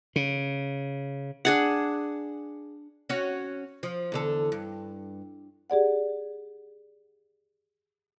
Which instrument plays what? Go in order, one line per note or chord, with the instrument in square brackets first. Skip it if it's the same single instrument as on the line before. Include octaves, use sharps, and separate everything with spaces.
[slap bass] C#3
[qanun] D4 G#4 F#5
[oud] C#4 F#4 C#5
F3
E2 D3 A4
G2
[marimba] G4 G#4 D5 F#5